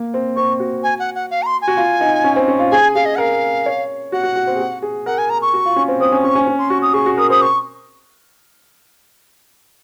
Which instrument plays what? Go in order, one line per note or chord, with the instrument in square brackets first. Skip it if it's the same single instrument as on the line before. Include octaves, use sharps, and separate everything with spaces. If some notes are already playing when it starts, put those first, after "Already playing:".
Already playing: [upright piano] A#3
C4
[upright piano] C4 [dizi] C#6
[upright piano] F#4
[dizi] G#5
F#5
F#5
F5
A#5
C6
G#5
[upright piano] F#4
F4
D#4
C#4
C4
C#4
F4
[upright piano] G#4 [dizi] G#5
[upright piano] G#4 [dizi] F5
[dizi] D#5
[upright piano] A#4 [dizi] F5 F#5
[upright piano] C#5
[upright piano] F#4 [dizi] F#5
[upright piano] F#4
F#4
C4
G#4
F#4
G#4
[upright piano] A#4 [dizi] F#5
[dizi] G#5
A#5
C#6
[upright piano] F#4
F4
C#4
C4
[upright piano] C4 [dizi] D#6
[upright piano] C#4
[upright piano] C#4 [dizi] C#6
[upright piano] C#4
C#4
[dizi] C6
[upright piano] F#4 [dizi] C#6
[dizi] D#6
[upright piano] G#4 [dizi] C#6
[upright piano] F#4
[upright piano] A#4 [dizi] D#6
[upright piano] C5 [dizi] D#6
[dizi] C#6